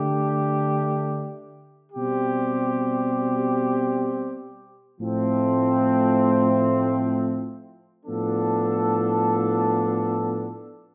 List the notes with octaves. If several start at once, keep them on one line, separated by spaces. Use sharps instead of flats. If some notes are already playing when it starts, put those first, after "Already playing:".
Already playing: D3 A3 D4 G4
B2 G3 C4 G4
A2 F3 A3 C4
A2 F3 B3 D4 A4